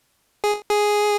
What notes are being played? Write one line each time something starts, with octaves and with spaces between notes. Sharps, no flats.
G#4
G#4